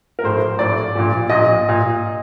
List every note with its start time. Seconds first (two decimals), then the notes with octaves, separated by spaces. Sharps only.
0.19 A#4
0.23 A#1 A2 C5
0.59 A#1 A2 D5
0.95 A#1 A#2
1.30 A#1 A#2 D#5
1.69 A#2